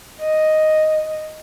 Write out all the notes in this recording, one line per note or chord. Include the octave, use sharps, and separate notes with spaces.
D#5